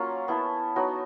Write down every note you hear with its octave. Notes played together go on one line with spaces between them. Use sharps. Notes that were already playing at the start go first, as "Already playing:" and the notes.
Already playing: F#3 A#3 C#4 F4
B3 E4 A4
F#3 B3 D#4 F#4